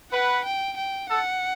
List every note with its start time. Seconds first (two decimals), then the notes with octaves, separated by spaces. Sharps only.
0.12 B4 F#5
0.45 G5
0.77 G5
1.09 A4 F#5